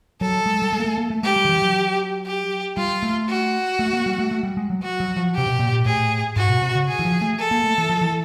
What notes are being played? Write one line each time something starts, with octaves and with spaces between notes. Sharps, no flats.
F#3 A4
G#3
G3
G#3
A#3
A3
A#3
A3
G#3 G4
G3
D#3
E3
F#3
G4
G3 F4
A3
F#4
A3
A#3
G3
A3
A3
G3
G#3
F#3
F#4
F#3
F3
C3 G4
B2
A#2
A#2
A2 G#4
G#2 F#4
B2
C3
C#3
G#4
E3
F3
A3
A4
A#3
A3
E3
F3
E3